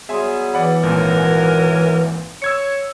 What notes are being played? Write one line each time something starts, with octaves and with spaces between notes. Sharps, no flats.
F#3 G3 B3 G#4 E5 G#5 C6
E3 D5 F#5 B5
G#1 F#2 A#2 A#4 F#5 G#5
C#5 E6 G#6 C#7